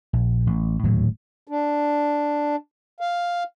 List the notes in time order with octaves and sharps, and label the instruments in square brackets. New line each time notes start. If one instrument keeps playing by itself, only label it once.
[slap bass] A#1
A1
D#1 D2 A2 F#3
[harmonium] D4
F5